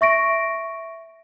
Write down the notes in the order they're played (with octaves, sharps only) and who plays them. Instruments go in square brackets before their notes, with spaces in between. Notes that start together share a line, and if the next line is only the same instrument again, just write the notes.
[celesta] E5 C#6 A#6 D7